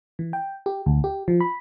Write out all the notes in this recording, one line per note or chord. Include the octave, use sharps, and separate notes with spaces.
E3
G5
G4
D2
G4
F3
B5